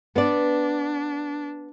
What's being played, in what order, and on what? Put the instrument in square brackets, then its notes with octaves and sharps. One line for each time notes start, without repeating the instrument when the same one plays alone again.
[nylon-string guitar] B3 D5 [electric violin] D4